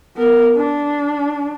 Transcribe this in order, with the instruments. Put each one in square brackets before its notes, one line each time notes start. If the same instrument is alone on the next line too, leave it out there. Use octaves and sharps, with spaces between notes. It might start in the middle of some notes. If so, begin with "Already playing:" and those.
[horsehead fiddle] B3 A#4
D4